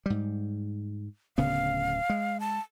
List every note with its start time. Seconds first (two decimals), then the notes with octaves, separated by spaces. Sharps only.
0.06 G#2 G3
1.38 D1 C#3 B3 F5
2.10 G#3
2.40 A5